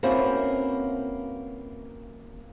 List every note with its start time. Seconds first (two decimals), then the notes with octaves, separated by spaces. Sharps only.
0.03 A#3 C4 C#4 E4 F#4 B4